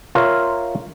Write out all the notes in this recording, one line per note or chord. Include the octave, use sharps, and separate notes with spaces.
F4 A#4 C#5 E5 F5